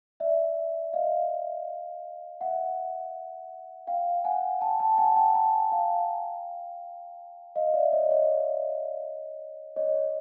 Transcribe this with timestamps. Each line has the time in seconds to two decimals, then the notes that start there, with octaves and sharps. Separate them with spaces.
0.20 D5 E5
0.93 D#5 F5
2.41 E5 F#5
3.87 F5 G5
4.25 F#5 G#5
4.61 G5 A5
4.80 G5 A5
4.98 F#5 G#5
5.16 G5 A5
5.35 G#5 A#5
5.72 F5 G5
7.56 D#5 F5
7.74 D5 E5
7.92 C#5 D#5
8.11 C#5 D#5
9.76 C#5 D#5